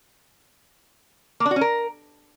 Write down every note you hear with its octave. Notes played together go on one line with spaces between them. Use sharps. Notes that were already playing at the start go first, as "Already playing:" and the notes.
A#3
D4
F#4
C#4
A#4